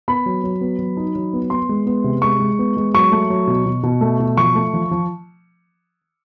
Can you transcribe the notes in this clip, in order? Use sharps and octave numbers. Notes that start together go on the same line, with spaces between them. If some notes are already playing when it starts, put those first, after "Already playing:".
B3 B5
F#3
F#3
B3
F#3
D#4
F#3
B3
B3 C6
G#3
B3
C3
G#3 C#6
G#3
B3
G#3
F#3 C#6
A3
F#3
B2
B2
B2
A3
B2
F3 C#6
A3
F3
F3